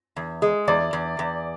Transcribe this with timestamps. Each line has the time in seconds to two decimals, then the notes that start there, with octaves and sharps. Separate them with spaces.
0.16 E2
0.42 G#3
0.68 E2 D5
0.93 E2
1.19 E2